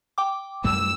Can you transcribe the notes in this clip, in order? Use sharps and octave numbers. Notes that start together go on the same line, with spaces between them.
G5 D6
F#2 G3 A3 E6